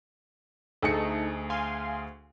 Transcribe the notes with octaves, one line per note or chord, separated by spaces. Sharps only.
D2 A3 D#4 G#4 A4 C#7
F5 G#5 C6